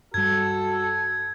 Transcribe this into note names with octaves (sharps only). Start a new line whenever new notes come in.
G2 G3 F#4 A4 G#6